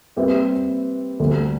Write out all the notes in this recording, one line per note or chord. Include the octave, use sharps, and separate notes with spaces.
G3 C4 G4 B4 E5
D2 D3 G3